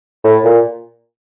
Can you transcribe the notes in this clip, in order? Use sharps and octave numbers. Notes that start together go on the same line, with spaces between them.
A2
A#2